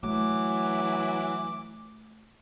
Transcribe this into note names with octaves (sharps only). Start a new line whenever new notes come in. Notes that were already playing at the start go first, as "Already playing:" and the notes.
E3 F#3 A3 D6